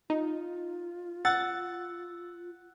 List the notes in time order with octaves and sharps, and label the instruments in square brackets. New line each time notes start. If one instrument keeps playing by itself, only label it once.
[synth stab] D#4 [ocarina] F4
[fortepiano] F#5 [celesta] E6 [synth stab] A6